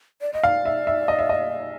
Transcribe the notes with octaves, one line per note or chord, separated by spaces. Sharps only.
D5
D#5
D5 F5
E5
E5
D#5
E5
D#5